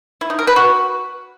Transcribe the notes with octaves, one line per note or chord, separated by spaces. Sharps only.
E4
D#4
A#4
B4
F#4